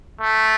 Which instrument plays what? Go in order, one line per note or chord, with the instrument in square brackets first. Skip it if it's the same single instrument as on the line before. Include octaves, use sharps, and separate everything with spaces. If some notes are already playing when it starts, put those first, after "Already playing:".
[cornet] A3